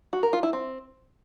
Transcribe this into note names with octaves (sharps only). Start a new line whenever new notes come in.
F#4
A#4
F4
E4
C4